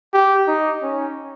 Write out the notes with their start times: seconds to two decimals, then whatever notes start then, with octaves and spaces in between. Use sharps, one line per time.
0.13 G4
0.48 D#4
0.82 C#4